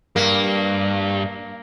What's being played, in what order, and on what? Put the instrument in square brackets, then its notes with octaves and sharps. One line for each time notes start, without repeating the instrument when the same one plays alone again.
[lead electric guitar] G2 [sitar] A#3